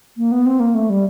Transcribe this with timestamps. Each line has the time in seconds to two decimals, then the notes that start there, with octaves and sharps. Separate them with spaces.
0.17 A#3
0.32 B3
0.46 C4
0.60 A#3
0.75 A3
0.90 G3